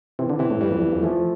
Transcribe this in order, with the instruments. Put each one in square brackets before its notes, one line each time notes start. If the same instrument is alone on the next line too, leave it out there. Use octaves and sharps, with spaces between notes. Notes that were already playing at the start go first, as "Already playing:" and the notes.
[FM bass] C3 [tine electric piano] E3
[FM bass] D3
[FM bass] C3 [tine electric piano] E3
[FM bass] A2
[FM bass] G2 [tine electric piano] E3 G3
[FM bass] F2
E2
F2
[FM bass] E2 [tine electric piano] F3 A3